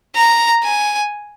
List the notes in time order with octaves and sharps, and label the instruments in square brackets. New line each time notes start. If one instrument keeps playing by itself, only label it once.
[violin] A#5
G#5